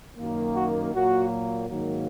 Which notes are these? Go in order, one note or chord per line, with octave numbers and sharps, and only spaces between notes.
F#2 D#3 A#3
F#4
A#2 F#3 A#3 F#4
G#2 D#3 F#3 A#3